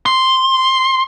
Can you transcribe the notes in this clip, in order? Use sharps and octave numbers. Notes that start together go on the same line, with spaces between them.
C6